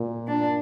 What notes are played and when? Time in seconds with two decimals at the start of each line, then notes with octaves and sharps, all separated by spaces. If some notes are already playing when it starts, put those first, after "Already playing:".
Already playing: A#2
0.28 D4